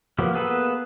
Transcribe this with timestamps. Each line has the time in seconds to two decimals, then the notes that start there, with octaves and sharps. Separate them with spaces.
0.18 F3 F#3 A#3 B3 G4
0.33 A#3 B3 G#4 A4 B4